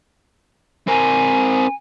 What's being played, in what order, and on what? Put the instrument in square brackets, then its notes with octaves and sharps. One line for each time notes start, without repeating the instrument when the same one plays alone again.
[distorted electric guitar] C4 A#4 [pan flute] G#5